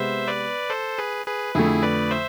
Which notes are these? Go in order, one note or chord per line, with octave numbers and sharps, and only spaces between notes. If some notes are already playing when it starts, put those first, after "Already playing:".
Already playing: C3 G#3 B3 C5 E5
B4 D5
A4 C5
G#4 B4
G#4 B4
F2 D3 A3 E4 G#4
B4 D5
C5 E5